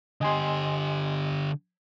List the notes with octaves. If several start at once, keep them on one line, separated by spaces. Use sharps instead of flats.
D3 G4 D#5 G#5 C6